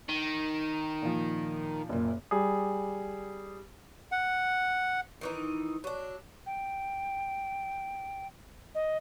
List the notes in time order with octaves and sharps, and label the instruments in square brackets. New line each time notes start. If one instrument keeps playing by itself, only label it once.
[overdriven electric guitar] D#3
[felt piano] A#2 F3
F#1 A#2
[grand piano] G3 G#4
[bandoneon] F#5
[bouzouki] D#3 E3 D#4
F#3 D4
[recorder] G5
D#5